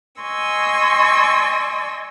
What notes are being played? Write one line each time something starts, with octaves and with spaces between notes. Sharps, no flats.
D#5 G#5 C6 C#6 E6